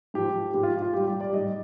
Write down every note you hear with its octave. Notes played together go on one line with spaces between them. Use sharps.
G#2 F3 G4
G#2 F3 G4
F4
F4
G#2 G3 G4
G4
D5
G#2 G3 D#5